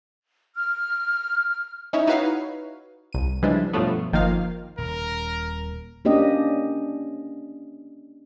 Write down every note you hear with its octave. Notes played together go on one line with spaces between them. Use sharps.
F6
C#4 D#4 E4 C#5
D#4 E4 F#4 B4 C#5 F5
C2 D#7
C#3 E3 F3 G3 G#3 D4
G2 B2 F3 F#3 A3 B3
G1 D#3 F3 A#3 F4 F5
D#1 A#4
A#3 C#4 D4 G4 D#5